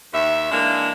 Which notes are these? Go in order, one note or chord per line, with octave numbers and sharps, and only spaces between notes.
D#2 E5
E3 G#3 A#3 D4